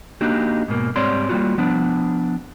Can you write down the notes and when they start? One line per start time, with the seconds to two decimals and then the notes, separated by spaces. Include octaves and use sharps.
0.21 A#3 D4 D#4 F#4 G4
0.68 G#2 B2 A#3
0.96 G#2 G3 C4 C#5 D5 C6
1.29 G3 A#3 C#4 F4 F#4
1.58 F3 B3 D4